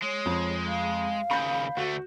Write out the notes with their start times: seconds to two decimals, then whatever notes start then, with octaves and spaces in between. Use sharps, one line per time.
0.03 G#3 C#5
0.25 F2
0.68 F5
1.31 D#2 C#3 B5 G6
1.77 D2 A3 F#4